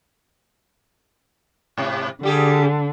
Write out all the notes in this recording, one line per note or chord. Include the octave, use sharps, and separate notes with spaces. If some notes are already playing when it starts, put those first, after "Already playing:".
G#2 C3
D3 G3 G4 G#4